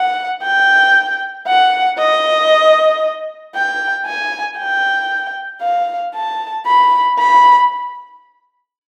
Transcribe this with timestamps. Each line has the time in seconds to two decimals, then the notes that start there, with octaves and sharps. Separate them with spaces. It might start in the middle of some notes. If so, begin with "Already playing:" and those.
Already playing: F#5
0.42 G5
1.47 F#5
1.98 D#5
3.55 G5
4.06 G#5
4.58 G5
5.62 F5
6.15 A5
6.66 B5
7.19 B5